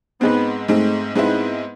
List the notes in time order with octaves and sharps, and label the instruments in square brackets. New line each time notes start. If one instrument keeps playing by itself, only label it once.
[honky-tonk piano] G#2 G#3 C4 [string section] B3
[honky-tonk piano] G#2 G#3 C4 [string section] A3
[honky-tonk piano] G#2 G#3 C4 E4 [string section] B3